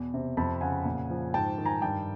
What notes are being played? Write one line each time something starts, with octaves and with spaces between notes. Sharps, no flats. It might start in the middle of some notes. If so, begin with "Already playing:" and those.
Already playing: E2 B2
C3
F2 A5 B5
C#3 F#5 G#5
A#2
F3
G#2 G5 A5
D#3
G#5 A#5
G2 G5 A5